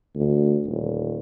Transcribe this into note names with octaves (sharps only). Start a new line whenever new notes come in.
D2
D#1